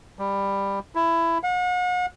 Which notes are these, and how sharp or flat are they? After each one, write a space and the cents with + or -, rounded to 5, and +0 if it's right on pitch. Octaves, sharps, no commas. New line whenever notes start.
G3 +15
E4 +15
F#5 -40